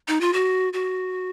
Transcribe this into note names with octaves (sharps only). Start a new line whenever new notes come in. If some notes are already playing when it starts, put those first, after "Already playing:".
D#4
F4
F#4
F#4